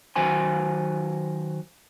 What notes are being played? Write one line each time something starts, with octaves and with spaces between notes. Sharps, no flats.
D#3 F#3 F#4 C5 G#5 C6